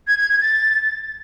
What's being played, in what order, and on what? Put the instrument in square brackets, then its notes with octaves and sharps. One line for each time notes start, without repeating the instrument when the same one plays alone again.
[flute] G#6
G#6
G#6
A6